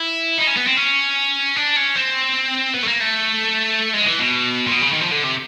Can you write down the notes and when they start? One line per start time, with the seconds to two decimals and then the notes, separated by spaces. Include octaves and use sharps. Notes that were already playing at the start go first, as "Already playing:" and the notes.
Already playing: E4
0.38 D#4
0.47 C#4
0.57 B3
0.67 C4
0.77 C#4
1.56 D4
1.76 C#4
1.96 C4
2.74 B3
2.83 A3
2.87 A#3
3.00 A3
3.94 G#3
4.06 E3
4.19 B2
4.67 A#2
4.71 B2
4.82 C#3
4.92 D#3
5.01 F3
5.12 D3
5.24 C3